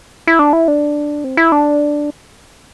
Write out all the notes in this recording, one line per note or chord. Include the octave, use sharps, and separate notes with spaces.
E4
D4
E4
D4
C4
E4
D4